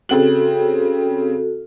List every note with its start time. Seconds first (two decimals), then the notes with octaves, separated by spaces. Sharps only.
0.09 C#3 C4 F#4 A4 F#7